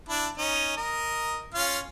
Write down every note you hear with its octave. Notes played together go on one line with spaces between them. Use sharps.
D4 E4
C#4 D#4
A#4 D#5
C#4 F4 F5